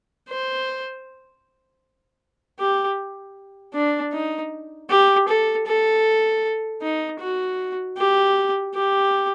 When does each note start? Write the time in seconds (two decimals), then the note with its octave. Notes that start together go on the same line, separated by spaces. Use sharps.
0.29 C5
2.59 G4
3.74 D4
4.13 D#4
4.90 G4
5.28 A4
5.67 A4
6.82 D#4
7.20 F#4
7.98 G4
8.74 G4